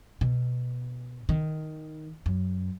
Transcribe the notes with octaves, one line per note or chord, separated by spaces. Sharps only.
B2
D#3
F#2